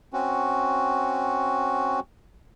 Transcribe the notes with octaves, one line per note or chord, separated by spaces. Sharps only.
C4 C#4 F#4